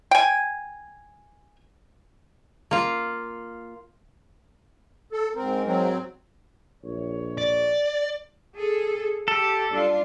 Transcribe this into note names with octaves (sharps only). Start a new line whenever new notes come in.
G5 G#5
A#3 F4
A4
G#2 C4 A#4
F#3 C4
A#1 C#5
D5
G#4 A4
G4 A4
G3 D4 F4